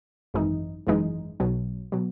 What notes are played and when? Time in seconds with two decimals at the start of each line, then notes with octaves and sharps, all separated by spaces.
0.34 G#1 F#2 E3 G#3 D#4
0.87 G#1 F#2 E3 G#3 D#4
1.40 B1 B2 F#3
1.92 B2 F#3